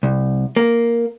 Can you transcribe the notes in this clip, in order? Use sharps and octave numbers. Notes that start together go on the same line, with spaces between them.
C2
A#3